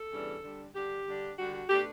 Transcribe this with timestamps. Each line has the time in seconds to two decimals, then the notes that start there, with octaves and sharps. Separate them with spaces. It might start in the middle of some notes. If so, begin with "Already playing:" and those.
Already playing: A4
0.12 E2 C#3 E3 G3 D4
0.44 D3 G3 D4
0.75 D3 G3 D4 G4
1.07 D3 G3 D4
1.38 D3 G3 D4 F#4
1.54 F#4
1.70 B2 A3 D4 G4